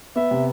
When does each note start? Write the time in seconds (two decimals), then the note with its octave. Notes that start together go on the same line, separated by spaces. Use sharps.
0.16 B3 E5
0.31 C3